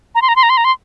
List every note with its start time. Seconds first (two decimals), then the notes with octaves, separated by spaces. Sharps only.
0.15 A#5
0.22 C6
0.28 A#5
0.36 C6
0.43 A#5
0.50 C6
0.57 A#5
0.65 C6